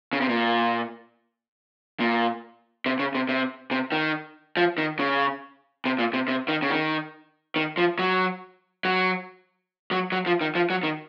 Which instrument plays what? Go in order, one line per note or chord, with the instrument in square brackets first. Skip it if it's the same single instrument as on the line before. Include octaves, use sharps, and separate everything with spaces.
[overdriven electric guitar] C#3
C3
A#2
A#2
C3
C#3
C3
C3
C3
D#3
F3
D#3
C#3
C3
A#2
C3
C3
D#3
C#3
D#3
D#3
F3
F#3
F#3
F#3
F#3
F3
D#3
F3
F#3
D#3